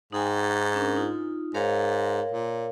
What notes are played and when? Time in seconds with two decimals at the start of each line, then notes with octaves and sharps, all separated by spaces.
0.12 G#2 D#4 G5 G#5
0.75 C#4 D4 A#4
0.97 D#4 F4
1.54 G#2 A#4 C#5 F5
2.32 A#2